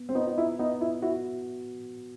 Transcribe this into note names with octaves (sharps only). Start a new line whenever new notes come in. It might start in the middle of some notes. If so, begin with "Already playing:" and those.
Already playing: B3
C4
B3 D#4
D#4
E4
B3 D#4
E4
E4 F#4